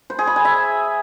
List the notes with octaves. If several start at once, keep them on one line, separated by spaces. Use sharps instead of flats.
C5
G#4
B5
G#5
E5